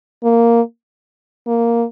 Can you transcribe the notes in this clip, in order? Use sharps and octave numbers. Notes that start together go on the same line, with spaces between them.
A#3
A#3